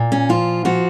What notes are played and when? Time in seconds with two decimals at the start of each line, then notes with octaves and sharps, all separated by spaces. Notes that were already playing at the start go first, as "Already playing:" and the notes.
Already playing: A#2
0.12 C#4
0.29 F3 F4
0.65 F3 F#4